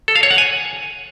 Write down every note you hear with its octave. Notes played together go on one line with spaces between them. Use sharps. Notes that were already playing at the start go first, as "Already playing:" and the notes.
A4
F5
C#5
F#5
G#5